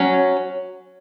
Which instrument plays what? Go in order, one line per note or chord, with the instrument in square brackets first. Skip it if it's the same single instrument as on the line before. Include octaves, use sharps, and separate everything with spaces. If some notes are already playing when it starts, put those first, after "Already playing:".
Already playing: [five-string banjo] F#3 C#4